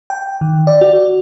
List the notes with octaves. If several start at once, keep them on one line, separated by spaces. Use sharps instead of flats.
G5
D#3
D5
F#4